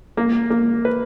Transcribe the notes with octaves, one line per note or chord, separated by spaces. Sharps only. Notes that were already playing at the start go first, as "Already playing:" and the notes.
A#3
A#3
B4